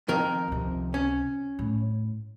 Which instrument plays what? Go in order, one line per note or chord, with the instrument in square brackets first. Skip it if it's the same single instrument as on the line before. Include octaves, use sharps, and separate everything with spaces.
[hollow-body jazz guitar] F2 D#3 A#4
[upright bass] C#2 C3
[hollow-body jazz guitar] C#4
[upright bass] A2